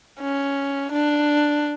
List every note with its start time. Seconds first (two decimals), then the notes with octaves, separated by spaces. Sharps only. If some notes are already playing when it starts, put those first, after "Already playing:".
0.21 C#4
0.92 D4